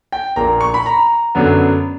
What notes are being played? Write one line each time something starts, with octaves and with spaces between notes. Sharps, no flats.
G5
A#1 A#2 A#3 A#5
C#6
B5
A#5
F#2 D3 F#3 B3